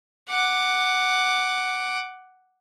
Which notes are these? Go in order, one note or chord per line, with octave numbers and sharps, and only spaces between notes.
F#5 D6